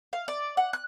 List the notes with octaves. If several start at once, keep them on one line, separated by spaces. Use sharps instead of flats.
F5
D5
F#5
F#6